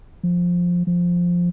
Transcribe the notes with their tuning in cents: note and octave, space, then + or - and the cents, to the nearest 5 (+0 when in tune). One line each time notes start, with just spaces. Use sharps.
F3 +10
F3 +5